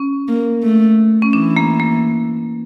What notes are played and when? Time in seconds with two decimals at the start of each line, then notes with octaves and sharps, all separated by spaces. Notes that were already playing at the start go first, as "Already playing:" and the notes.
Already playing: C#4
0.28 A#3
0.63 A3
1.22 C#4
1.33 E3 D4
1.57 A#3
1.80 A#3